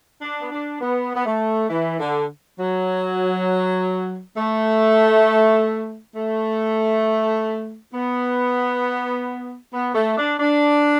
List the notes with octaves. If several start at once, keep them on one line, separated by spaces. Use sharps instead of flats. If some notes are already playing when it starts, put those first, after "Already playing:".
D4
B3
D4
B3
B3
A3
E3
D3
F#3
A3
A3
B3
B3
A3
D4
D4